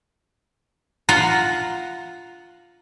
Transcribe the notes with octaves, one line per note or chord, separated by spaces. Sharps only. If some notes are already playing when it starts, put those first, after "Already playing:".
F4 F#5 A#5